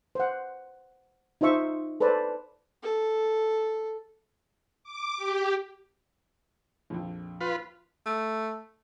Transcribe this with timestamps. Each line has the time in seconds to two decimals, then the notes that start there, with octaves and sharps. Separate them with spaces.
0.15 C5 F#5
1.41 D#4 F4 C5 E5 C#6
2.00 A4 B4 C5 D5 A5
2.83 A4
4.84 D6
5.17 G4
6.90 A#1 F2
7.41 F4 B4
8.06 A3